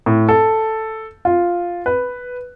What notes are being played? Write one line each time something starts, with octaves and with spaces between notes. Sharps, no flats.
A2
A4
F4
B4